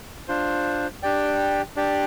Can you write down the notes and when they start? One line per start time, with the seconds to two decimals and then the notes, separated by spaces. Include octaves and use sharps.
0.28 D4 F4 C5
1.03 D4 G4 D5 G5
1.76 D4 G4 D5 G5